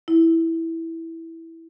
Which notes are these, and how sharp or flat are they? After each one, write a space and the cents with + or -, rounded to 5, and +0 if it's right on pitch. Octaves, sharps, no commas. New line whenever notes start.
E4 -5